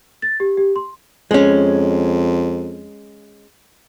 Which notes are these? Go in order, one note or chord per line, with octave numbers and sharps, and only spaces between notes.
A6
G4
G4
C6
F2 G#3 C#4